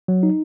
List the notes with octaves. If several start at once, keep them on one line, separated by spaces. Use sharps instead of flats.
F#3
D#4